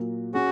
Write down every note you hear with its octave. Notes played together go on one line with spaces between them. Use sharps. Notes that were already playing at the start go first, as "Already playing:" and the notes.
Already playing: A#2 F#3 A#3 F#4
C#4 F#4 G#4